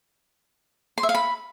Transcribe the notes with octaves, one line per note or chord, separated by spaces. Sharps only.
C6
E5
F5
B5